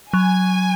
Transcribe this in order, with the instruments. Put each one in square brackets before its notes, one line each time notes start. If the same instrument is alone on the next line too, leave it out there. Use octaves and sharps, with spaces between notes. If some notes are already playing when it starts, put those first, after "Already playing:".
[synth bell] F#3 [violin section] G#5